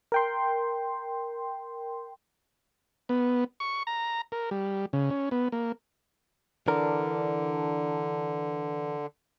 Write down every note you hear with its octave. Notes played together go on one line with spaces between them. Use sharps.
A#4 G5 C6
B3
C#6
A#5
A#4
G3
C#3
C#4
B3
A#3
D3 E3 D4 A#4